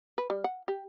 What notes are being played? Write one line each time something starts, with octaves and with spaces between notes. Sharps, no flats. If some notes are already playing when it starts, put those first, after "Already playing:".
B4
G3
F#5
G4